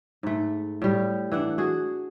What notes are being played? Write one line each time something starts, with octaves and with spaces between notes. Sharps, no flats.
G#2 A3
A2 G3
E3 D4 F#5
F#4 G#4